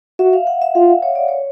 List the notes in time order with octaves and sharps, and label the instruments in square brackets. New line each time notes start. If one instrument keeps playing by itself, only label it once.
[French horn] F#4 [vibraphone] E5
[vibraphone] F5
F#5
E5
[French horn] F4 [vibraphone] F5
[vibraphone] C#5
D5
C#5